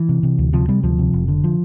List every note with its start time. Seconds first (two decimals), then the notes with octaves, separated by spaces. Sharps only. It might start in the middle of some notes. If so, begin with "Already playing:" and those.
Already playing: E3
0.09 C3
0.23 C3
0.38 D2
0.53 C3 F3
0.68 C3 G3
0.83 D2 F3
0.99 C3
1.13 F1
1.28 D3
1.44 F3